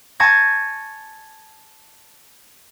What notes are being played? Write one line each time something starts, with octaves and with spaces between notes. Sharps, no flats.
G#5 A5 C#6 G#6 A#6